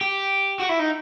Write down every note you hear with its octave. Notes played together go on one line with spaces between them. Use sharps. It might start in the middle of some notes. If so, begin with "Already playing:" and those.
G4
F#4
E4
D#4